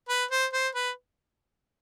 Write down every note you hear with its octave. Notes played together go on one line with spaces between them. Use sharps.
B4
C5
C5
B4